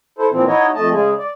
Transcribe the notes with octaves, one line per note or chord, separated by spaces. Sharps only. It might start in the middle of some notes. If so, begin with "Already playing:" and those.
E4 A4 C5
A#2 E3 F3 C4
D#4 E4 F#4 C#5 D#5
F2 A3 D#5 A5
C#3 G#3 G#4
D5